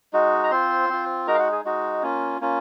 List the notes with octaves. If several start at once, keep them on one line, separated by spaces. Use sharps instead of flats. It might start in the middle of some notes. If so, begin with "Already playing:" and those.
G#3 D#4 F#4
A#5
C4 F4 C5 C6
C4 F4
G#3 D#4 F#4 A#4 A#5
F5
F#4 F#5
G#4
G#3 D#4 F#4
A#3 C#4 F4
A#3 C#4 F4